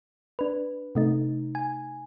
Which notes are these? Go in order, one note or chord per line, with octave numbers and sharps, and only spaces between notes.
D4 B4
C3 A3 D#4
G#5